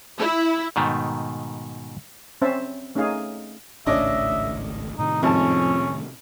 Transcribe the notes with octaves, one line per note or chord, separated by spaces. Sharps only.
E4
G#2 B2 D#3 A3
C4 C#4 C5 E5 A5
A3 C#4 D#4 G#4 F5
G#1 C#2 A2 C#4 D4 D#5 E5
A2 C3 D#3 D#4
G#1 F2 C#4 A5